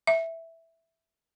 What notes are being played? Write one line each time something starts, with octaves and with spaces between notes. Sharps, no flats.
E5